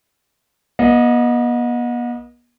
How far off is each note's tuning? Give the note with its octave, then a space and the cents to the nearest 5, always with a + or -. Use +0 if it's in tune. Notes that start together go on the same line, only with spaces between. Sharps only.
B3 -40 D#5 +0